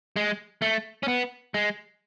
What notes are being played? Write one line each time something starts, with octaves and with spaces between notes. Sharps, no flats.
G#3
A3
C#4
B3
G#3